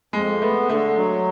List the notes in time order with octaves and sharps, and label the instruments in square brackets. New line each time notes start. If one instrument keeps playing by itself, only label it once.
[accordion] F2 [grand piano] G#3
[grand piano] A3 [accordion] B3
[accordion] D3 [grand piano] A3
[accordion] F#3